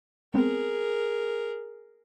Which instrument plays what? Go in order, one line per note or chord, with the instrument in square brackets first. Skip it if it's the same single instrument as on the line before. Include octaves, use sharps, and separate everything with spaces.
[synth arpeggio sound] G#3 B3 C4 [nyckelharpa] G#4 A#4